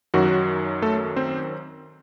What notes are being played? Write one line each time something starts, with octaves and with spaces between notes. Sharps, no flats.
F#2 D#3 F#3 F#4
A3 A4
C4 C5